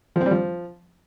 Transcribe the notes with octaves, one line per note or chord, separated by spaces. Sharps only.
F3
C4
G3
F3